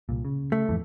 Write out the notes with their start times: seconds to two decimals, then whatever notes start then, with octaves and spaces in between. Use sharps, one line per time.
0.09 C2 A#2
0.25 C#3
0.52 A3
0.69 F2 A2 E3